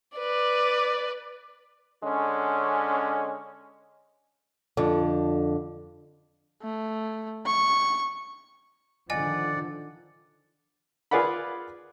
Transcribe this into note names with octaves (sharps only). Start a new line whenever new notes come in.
B4 D5
D3 G#3 C#4
F2 D3
A3
C#6
D3 D#3 F3 D5 D#5 F#5 G#5
F4 G#4 B4 D5 F#5 B5